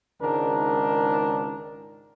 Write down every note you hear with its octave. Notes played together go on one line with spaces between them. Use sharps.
C#2 G#2 D#3 D4 A#4